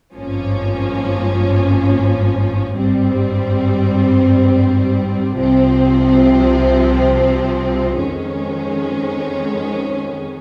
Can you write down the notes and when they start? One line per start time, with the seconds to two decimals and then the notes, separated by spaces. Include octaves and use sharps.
0.14 G#1 G2 F3 A#3 C#4
2.75 G#1 G2 G3 C4
5.37 C2 C3 F3 C4
7.99 F2 D#3 G#3 C#4